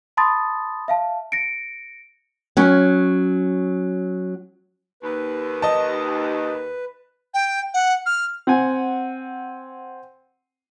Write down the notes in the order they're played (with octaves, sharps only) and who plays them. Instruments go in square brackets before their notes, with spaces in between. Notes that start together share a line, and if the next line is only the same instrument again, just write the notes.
[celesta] A5 B5 C6 D#6 A6
E5 F5 A5
A#6 C#7 D7
[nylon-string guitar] F#3 C#4
[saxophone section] D#2 [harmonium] B4
[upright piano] D#5 A5
[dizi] G5
F#5
F6
[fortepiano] C4 F#5 G#5